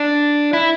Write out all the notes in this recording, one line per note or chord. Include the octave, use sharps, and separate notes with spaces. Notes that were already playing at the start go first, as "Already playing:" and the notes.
Already playing: D4
E4